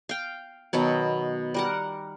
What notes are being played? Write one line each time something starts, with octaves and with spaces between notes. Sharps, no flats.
F5 G5
B2 D#3 F#3 B3
G3 A#4 F#5